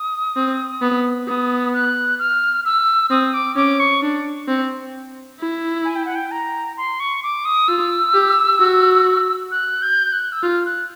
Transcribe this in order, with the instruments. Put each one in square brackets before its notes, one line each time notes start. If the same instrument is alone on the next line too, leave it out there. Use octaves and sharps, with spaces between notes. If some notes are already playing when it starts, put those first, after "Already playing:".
Already playing: [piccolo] D#6
[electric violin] C4
B3
[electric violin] B3 [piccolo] D#6
[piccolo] F#6
F6
E6
[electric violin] C4 [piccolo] D#6
[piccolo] D6
[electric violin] C#4 [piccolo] D6
[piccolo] C#6
[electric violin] D4
C4
E4
[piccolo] G#5
G5
F#5
G5
A#5
C6
C#6
D6
D#6
[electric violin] F4 [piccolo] E6
[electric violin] G4
F#4
[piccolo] F#6
G6
F#6
E6
[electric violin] F4 [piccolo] F6
[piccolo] F#6